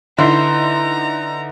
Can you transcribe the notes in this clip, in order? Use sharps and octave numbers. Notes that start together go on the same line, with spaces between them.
D3 D#4 E4 B4 E5 A#5 C6